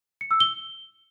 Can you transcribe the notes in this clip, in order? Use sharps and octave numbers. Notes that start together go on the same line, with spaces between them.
C#7
E6
G7